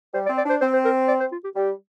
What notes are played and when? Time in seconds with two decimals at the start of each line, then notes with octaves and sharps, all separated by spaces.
0.14 G3 C5
0.26 D5
0.30 C4
0.37 D5
0.46 D4 C5
0.61 C4 C5
0.73 C5
0.85 A#4
1.08 D5
1.20 C5
1.32 F4
1.44 G4
1.56 G3 G4